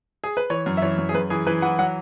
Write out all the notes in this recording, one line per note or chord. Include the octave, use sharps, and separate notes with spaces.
G#4
B4
E3 C#5
F#2
E5
E3 C#5
F#2
G#4
F#2 B4
E3 G#4
E3 B4
E3 F#5
F#3 F#5